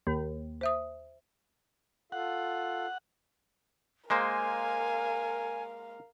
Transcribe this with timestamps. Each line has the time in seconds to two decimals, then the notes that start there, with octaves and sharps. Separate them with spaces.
0.07 D#2
0.61 C5 E5 D#6
2.12 F4 A4 F5 F#5
4.10 G#3 A#3 A#4 C5 F5 G#5